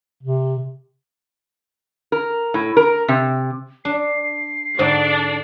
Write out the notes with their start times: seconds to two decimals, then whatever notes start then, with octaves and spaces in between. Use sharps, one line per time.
0.23 C3
2.12 A#4
2.54 A2
2.77 A#4
3.08 C3
3.85 D4 C7
4.79 G#2 D3 D4 C5 D5 G5